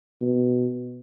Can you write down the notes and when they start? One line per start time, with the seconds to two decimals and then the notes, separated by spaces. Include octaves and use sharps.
0.21 B2